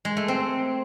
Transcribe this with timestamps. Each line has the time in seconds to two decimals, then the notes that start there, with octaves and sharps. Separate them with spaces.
0.05 G#3
0.17 A3
0.28 C4